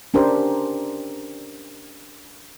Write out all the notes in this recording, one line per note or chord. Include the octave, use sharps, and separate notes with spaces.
C#4 D4 G4 A#4 C5